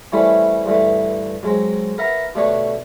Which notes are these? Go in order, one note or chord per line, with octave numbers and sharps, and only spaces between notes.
E3 G3 A3 C4 C#4 E4
G2 D3 E3 A3
F#3 G#3 C4
A#4 B4 E5 F#5 A#5
B2 D3 A3 D4 G4 C#5